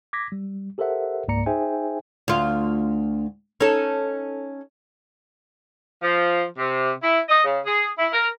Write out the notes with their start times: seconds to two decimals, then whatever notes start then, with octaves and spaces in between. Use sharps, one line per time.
0.13 D6 G#6 A#6 B6
0.32 G3
0.78 G4 A4 A#4 C5 E5 F#5
1.28 C#2 G#2 A#3 D5 A#5 C#7
1.46 D#4 G#4 C5 E5 G5 G#5
2.28 D2 F4
3.60 C#4 D#4 A4
6.02 F3
6.57 C3
7.02 E4
7.29 D#5
7.44 C#3
7.65 G#4
7.98 E4
8.13 A#4